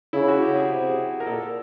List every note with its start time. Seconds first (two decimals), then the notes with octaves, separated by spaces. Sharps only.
0.13 C#3 E4
0.28 F#4
0.42 G4
0.56 G#4
0.69 C3
1.20 A#4
1.26 A#2 A4